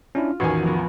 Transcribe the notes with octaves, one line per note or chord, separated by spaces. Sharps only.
C#4 D4 E4 F4
A1 E2 D#3 F#4 G#5 C#6 G#6 C7
F3 B3 A#4